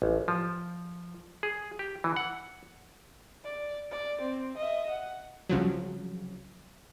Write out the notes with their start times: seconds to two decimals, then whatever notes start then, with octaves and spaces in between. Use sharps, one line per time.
0.02 A1
0.28 F3
1.43 G#4
1.79 G4
2.04 E3
2.16 F#5
3.44 D5
3.91 D5
4.21 C4
4.57 D#5 E5
4.90 F#5
5.49 C2 C#3 F3 F#3